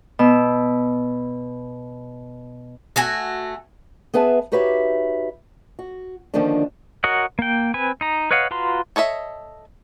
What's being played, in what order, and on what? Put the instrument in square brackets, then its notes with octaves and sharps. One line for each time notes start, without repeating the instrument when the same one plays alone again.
[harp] B2 E6
[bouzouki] A3 F#4 G#5
[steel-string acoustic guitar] B3 G#4 B4 E5 A5
D#4 F#4 G4 B4 C#5 E5
F#4
D3 D#3 F3 A#3 C#4 D4
[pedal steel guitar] F#4 A#4 C#5 D#5 F#5
A#3 G5
C4 B4 G#5
D#4 A#5
B4 C#5 D#5 F5 F#5
F4 F#4 B4 A#5 C6
[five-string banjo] A4 C#5 D#5 E5